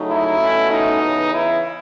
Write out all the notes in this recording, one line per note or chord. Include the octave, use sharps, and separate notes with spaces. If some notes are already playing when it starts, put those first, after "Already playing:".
Already playing: C#3 F#3 A3 D#4
E4
B2 A3 C#4
D#4
C#3 E3 B3
E4